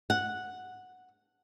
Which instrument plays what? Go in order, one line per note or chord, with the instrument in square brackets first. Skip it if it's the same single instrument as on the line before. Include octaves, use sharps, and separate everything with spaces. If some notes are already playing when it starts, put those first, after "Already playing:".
[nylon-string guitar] F#5